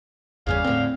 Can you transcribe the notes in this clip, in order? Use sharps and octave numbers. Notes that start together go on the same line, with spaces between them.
G1 E2 C#3 G3 C#4 F5
A2 D3 C4